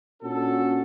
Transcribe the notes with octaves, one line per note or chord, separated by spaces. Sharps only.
A#2 C#4 D4 F#4 A4